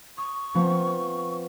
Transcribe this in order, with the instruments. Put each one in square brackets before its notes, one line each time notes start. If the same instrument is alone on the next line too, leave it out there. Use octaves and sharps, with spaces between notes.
[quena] C#6 [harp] D#6
[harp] F3 B3 C4